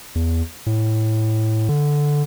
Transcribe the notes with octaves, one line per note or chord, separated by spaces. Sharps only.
E2
A2
D3